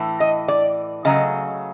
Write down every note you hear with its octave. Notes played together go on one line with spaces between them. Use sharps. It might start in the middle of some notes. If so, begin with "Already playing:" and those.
Already playing: A2 E3
D#5
D5
C#3 F#3 A3 D#5